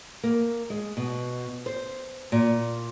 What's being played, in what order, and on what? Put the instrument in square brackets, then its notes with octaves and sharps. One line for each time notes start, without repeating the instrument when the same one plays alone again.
[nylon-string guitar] A#3
G#3
B2
C5
A#2